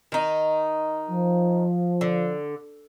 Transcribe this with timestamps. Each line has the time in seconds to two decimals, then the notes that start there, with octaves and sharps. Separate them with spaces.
0.12 D#3 D#4
1.10 F3
2.01 D3